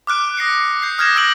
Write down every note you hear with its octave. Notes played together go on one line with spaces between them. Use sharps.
D6 F6 F#6 D7
D#6 A#6 C7 C#7
G6 C7
D#6 F6 G6 G#6 A#6 E7
E6 F#6 A#6 D7 F#7